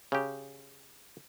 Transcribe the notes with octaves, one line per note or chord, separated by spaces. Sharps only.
C#3 G4